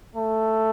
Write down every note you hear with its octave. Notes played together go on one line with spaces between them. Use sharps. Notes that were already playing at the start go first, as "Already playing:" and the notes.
A3